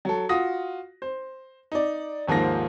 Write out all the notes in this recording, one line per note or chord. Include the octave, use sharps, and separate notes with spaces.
F#3 A4
F4 F#4 D#6 A#6
C5
D#4 D5
D#1 G#2 F3 A#3 F4 A#6